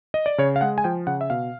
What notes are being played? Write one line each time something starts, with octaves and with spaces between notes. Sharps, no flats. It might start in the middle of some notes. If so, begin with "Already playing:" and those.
D#5
D5
C#3 C#5
F5
G#3 F#5
G#5
F3 G5
C#3 F#5
E5
B2 F5